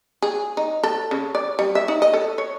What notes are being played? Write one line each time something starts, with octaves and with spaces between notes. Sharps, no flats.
G#4
D#4
A4
C#3
D5
G3
E5
D#4
D#5
A4
C#5